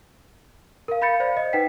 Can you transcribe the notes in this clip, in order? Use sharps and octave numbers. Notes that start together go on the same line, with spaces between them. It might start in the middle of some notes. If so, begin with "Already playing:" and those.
A#4 F5
F5 B5 G6 A6 C#7
C5 D5 F5
D#5
D#4 B4 F#5 G5 B6